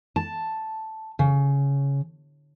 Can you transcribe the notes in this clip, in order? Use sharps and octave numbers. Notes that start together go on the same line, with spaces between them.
A5
C#3